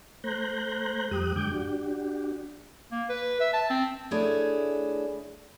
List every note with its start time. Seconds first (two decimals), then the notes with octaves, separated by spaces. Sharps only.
0.24 A3 C5 A#5 F#6 G6
1.11 F2 G3 G4 D#6 F#6
1.36 F#2 D3 G#3 G5 D6 G6
1.51 D4 F#4 G4
2.91 A#3
3.09 B4
3.40 E5
3.53 A5
3.70 C4
4.11 A3 D4 E4 G#4 C#5